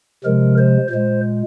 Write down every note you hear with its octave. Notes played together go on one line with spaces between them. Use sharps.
C3 F3 G#3 A#4
C5
A#2 G#3 C5